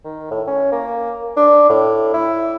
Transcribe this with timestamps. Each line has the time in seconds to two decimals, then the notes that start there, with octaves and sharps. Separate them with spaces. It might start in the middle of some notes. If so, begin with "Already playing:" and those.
0.05 D#3
0.31 A2
0.48 C#4
0.72 A#3
1.37 D4
1.70 A2
2.14 E4